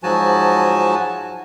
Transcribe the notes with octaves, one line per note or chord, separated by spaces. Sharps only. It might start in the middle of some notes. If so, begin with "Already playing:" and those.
G#2 F3 F#3 F#4 G#5 A5